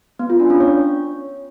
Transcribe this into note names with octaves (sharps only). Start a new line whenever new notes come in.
B3
F4
D4
C#4
C#5